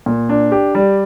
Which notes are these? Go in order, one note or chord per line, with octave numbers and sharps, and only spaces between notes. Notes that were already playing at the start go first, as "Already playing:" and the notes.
A#2
D4
G4
G3